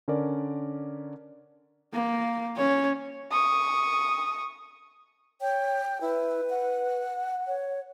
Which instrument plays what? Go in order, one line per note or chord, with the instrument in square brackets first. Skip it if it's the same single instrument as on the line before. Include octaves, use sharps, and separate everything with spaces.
[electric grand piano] D3 C#4 A#4 D5
[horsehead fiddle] A#3
C#4 C#5
[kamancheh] C#6 D#6
[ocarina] C#5 [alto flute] G5
[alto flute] E4 [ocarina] B4
[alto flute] F#5
[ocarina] C#5